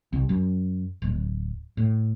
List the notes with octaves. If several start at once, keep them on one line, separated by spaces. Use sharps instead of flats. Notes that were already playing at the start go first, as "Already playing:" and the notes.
C2
F#2
D1
A2